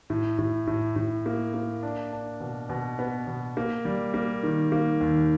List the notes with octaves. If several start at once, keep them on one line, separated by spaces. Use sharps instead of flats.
A2
A2
A2
A2
A#3
A#3
D4
D4
B2
B2
B3
B2
A#3
G3
A#3
D#3
A#3
D#2